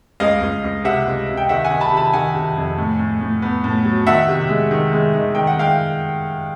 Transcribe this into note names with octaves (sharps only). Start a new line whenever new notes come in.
C#2 D#5 F5
C#2
C#2
C3 E5 F#5
C#2
C3
G5
D#3 E5 F#5
F#5 G#5
D#3
A5 B5
C3
A5 B5
D#3 F#5 G#5
C3
F2
A2
A2
A2
B3
A2
F#3
D#3 E5 F#5
C3
G#3
D#3
G#3
D#3
D#3 G5
F#5
G#3 F5 G5